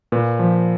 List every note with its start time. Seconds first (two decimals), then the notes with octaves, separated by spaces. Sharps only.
0.12 A#2 B4
0.39 F3